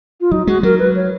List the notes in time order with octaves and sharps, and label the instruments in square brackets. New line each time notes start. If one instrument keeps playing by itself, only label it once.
[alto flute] F4
[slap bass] F#3 [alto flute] D#4
[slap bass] G#3 [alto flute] F#4
[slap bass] F#3 [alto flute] A#4
[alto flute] B4
C#5